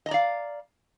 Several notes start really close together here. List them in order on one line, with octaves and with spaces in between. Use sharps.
D#5 A#5 D5 F5